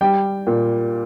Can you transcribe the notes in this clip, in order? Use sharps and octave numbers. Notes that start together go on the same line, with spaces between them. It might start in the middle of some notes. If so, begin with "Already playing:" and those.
G3 G5
A#2